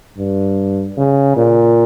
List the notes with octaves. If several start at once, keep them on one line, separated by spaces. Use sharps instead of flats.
G2
C#3
A#2